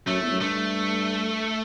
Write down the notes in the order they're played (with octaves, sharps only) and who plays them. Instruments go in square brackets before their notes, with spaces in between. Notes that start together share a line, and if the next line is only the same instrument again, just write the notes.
[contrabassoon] F#2 [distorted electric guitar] A3
[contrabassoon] E2
F#2
[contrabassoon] G2 [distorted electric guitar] A3